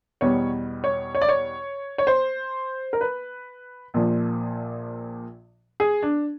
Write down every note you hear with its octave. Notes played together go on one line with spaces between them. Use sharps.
E2 B2 G3 C#5
C#5
C#5
D5
C#5
C#5
C5
A#4
B4
A#1 A#2 F3
G#4
D4